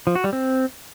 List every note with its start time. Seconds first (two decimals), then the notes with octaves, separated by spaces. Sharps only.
0.07 F3
0.15 F#4
0.24 G3
0.33 C4